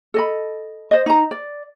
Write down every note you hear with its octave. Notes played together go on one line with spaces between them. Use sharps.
A4 D#5 B5
C5 D#5
D#4 A#5
D5